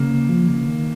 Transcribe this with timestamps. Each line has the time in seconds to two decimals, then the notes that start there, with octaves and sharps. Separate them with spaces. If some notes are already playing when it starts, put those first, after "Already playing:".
Already playing: C#3 A#3
0.29 F3
0.48 C#3
0.67 D#3